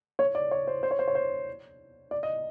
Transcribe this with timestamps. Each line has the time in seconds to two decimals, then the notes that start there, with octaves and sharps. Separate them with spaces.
0.19 C#5
0.35 D5
0.51 C#5
0.67 C5
0.83 C5
0.91 C#5
0.99 C5
1.08 C#5
1.15 C5
2.11 D5
2.23 D#5